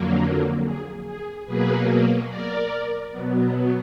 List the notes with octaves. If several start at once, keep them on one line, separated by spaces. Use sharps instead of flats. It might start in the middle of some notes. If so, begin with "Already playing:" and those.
Already playing: F2 D3 F#3 A#3
G#4
G#4
B2 F#3 A#3 G#4 B4
A#4 D5
B2 F#3 B3